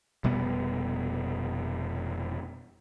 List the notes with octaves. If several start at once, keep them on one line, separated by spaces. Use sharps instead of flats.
F1 B2 G3 B3